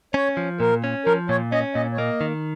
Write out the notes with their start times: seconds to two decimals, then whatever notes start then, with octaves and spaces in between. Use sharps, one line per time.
0.14 C#4 C#5
0.37 F3
0.60 A#2 A#4
0.84 C#4
1.06 F3 A#4
1.29 A#2 C#5
1.52 C#4 D#5
1.75 A#2 D#5
1.92 C#5
1.98 A#3 D#5
2.21 D#3